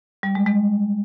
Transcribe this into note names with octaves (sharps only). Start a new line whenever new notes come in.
G3
G#3
G#3